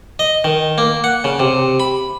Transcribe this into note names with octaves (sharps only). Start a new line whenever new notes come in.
D#5
D#3
A#3
F#5
C#3
C3
B5